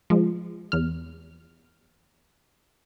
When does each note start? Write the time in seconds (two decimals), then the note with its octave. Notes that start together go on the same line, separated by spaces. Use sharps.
0.10 F3 G#3
0.72 E2 F6